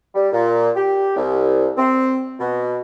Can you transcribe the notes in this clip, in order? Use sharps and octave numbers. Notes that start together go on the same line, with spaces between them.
G3
A#2
G4
C2
C4
B2